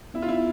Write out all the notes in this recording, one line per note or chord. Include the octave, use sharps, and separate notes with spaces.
B3 E4
F4
D#4 E4